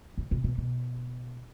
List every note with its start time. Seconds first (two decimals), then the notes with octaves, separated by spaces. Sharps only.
0.18 C#3
0.31 C3
0.44 B2
0.58 B2